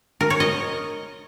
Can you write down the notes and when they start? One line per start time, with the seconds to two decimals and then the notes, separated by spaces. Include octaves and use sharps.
0.21 A#4
0.30 C#5
0.40 D#5